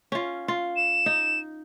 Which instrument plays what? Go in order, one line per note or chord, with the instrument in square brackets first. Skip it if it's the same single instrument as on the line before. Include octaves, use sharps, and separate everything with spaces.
[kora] C#4 F4
F4
[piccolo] E7
[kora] D#4